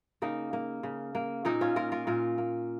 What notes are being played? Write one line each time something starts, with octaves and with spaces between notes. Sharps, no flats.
C#3 A#3 D#4
A#3
C#3
A#3
A#2 A#3 D#4
C#4 F4
A#3 F4 A#4
F4 A#4
A#2 F4 A#4
A#3